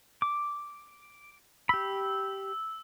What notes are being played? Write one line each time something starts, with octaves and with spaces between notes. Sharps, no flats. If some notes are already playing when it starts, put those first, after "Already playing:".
D6
G4 B5 E6